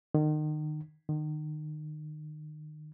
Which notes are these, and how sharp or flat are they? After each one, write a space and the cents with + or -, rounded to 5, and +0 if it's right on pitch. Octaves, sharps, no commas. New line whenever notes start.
D#3 -35
D#3 -35